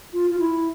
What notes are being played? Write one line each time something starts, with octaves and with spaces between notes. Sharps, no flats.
F4
F4
E4